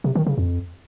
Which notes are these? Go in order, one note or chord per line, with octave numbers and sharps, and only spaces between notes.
C3
D#3
C#3
F2